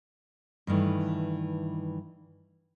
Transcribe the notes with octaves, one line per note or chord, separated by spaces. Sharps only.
G2 D#3 E3 A3